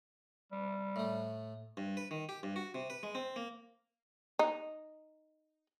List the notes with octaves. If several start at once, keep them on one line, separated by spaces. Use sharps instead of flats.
G3
A2 A3
G2
B4
D#3
G4
G2
F#4
C3
B4
G#3
C4
A#3
D#4